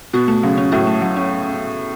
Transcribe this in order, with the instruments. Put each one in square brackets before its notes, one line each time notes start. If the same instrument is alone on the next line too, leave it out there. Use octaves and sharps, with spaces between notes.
[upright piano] B2 [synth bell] F#4
[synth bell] A3
[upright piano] C#3 [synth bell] F#3
[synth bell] C#4
[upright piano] A2 [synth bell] F#4
[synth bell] A3
F#3
C#4